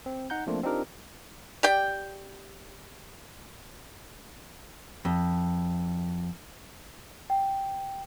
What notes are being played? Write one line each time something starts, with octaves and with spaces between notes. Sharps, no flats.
C4
D#4 F#5 A#5 G6
F3 A3 A#3 C4 D4 F4
C4 D4 D#4 F4 G4 A#4
G4 D5 G5
F2
G5